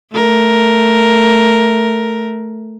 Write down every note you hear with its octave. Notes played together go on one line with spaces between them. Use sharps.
A3 A#4